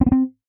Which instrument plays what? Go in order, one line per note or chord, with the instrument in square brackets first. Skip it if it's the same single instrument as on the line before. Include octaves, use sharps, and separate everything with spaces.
[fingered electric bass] C4
B3
C4